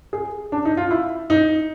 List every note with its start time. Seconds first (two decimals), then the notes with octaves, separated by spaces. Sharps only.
0.13 G#4
0.52 D4
0.65 D#4
0.77 F4
0.91 E4
1.30 D#4